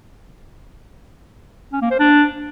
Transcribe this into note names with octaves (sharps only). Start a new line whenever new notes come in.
C#4
A#3
C5
D4